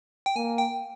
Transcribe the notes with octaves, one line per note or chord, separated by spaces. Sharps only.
G5
A#3 G#5
G5